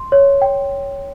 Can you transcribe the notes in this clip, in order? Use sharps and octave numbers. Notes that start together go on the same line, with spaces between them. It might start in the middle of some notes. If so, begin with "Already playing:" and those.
Already playing: C6
C#5
G5